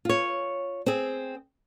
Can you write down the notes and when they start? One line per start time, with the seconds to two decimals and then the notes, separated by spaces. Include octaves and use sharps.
0.05 F4 C#5
0.86 C4 G#4